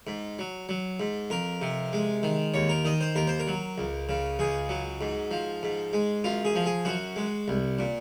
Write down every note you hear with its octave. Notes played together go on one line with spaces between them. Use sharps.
G#2
F#3
F#3
G#2
F2 A#4
C3
G#3
D#3
D#2 C#5
A#4
D#3 D#5
C5
D#2 A#4
C5
A#4
F#3
C#2
C#3
C#2 G#4
F#3
G#2
F3
G#2
G#3
F#2 F4
G#4
F3
G#4
F#2 F#4
G#3
C2
A#2